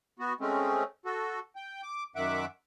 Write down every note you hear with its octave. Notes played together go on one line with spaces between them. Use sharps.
B3 F#4
G#3 A3 C4 C#4
F#4 A4
G5
D6
F#2 D#3 E5 F#5 D6